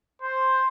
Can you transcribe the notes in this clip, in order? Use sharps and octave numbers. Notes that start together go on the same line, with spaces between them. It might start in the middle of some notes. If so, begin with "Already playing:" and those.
C5